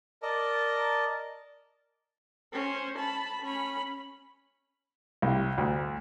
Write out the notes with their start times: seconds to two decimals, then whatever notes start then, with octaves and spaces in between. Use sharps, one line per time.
0.22 A#4 D5 D#5 A5
2.53 C#4 C5
2.98 A5 B5
3.43 C#4 B5
5.22 C2
5.58 D2